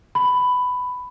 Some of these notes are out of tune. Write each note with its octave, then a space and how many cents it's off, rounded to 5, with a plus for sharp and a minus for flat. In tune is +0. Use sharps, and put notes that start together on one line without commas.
B5 +10